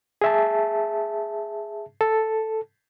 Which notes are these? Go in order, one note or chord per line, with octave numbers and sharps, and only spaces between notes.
G#4 E5 A5
A4